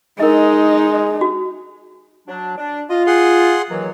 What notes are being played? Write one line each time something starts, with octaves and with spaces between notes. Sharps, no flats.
G#3 D#4 A#4 D#5
F#4
F#3 D4
D4
F4 D#5
G#4 F#5 C6
D#2 E3 F#3